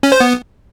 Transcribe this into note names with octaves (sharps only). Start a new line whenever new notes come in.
C#4
C5
B3